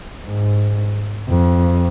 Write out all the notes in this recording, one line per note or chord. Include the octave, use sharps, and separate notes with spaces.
G#2
F2